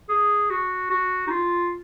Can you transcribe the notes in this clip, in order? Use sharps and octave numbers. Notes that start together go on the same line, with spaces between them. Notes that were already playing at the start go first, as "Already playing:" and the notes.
G#4
F#4
F#4
D#4
F4